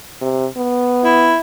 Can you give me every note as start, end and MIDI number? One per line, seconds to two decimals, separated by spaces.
0.21 0.46 48
0.57 1.35 59
1.05 1.40 64